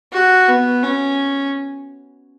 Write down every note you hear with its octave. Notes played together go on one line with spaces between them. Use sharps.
F#4
B3
C#4